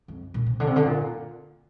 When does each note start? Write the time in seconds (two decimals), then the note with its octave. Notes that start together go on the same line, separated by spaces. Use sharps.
0.08 F2
0.34 A#2
0.46 C3
0.60 D3
0.67 C3
0.76 D3
0.85 A#2